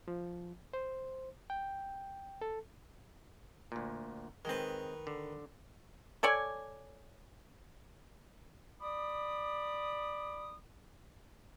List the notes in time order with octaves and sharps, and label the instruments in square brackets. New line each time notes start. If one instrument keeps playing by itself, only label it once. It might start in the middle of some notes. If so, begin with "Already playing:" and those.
[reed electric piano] F3
C5
G5
A4
[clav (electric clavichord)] D2 A#2
[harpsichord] D#3 B4 [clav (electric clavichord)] G#3 C4
[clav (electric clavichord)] D3
[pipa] A4 C#5 D5 G#5
[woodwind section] D5 B5 D6 D#6